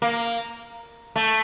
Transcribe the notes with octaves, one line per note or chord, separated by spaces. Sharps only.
A#3
A3